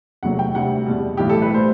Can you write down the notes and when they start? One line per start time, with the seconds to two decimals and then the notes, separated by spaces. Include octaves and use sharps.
0.23 E2 C3 F#3 A3 F#5
0.39 G5
0.54 D2 C3 G3 F#5
0.86 E2 B2 G3
1.17 B1 A2 E3 G3 G4
1.30 A4
1.42 B4
1.52 A2 G3 C5